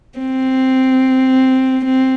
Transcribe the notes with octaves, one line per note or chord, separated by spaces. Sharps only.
C4
C4